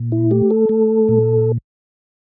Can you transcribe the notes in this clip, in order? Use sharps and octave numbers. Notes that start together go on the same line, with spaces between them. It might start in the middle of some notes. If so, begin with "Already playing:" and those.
Already playing: A#2
E4
A3 G4
A4
A3
A#2